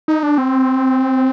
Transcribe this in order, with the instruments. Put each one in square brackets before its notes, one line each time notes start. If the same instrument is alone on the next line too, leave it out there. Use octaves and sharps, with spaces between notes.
[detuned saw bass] D#4
D4
C4